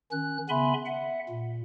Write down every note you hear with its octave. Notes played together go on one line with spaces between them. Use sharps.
D#3 C#4 F#6
C#3 B3 E5 G#5 B5 C6
E5 F#5
A#2